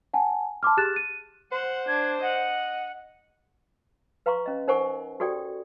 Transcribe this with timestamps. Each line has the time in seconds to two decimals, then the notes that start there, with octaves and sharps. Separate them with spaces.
0.14 F#5 G#5 A5
0.63 A5 C6 D6 F6
0.77 G4 G#4 F#6 A6 E7
0.96 D#7
1.52 C5 F#5
1.88 D4 G#6
2.22 D#5 F#5
4.26 B4 F5 A#5 C6 C#6
4.46 C#4 D#5
4.68 D#4 A#4 C5 F#5 G#5 C#6
5.20 F#4 G4 A4 D5 G5